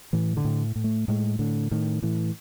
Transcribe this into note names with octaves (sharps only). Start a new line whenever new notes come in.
A2 E3
D3
A2
A2
A3
A2 G#3
A2 D3
A2 D#3
A2 E3